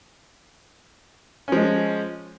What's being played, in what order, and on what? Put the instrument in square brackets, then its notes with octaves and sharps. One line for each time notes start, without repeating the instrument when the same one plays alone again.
[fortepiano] C#4
F3
G#3